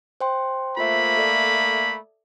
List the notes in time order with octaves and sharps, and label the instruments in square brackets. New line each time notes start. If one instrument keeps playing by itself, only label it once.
[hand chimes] C5 G5 C6
[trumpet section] A3 A#3 B5 [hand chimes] F4 C5 E5
[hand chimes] A4 D5 E5